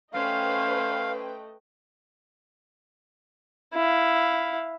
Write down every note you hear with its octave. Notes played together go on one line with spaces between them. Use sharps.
A3 C#4 B4 C5 D#5 F5 G5
E4 F5